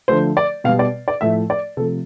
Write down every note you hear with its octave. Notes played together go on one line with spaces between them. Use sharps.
D3 F3 A3 C5
D5
B2 G3 F5
D5
D5
A2 F3 A3 E5
D5
C3 F3 A3 A4